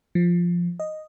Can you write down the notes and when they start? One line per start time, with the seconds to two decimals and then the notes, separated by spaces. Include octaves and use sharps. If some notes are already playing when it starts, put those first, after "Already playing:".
0.15 F3
0.80 D#5